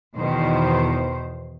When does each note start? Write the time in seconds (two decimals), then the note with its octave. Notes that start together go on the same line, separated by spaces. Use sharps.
0.17 E2 B2 D#3 C5